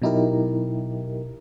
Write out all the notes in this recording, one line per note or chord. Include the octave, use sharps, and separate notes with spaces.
B2 F#3 D#4 E4 G4 A#4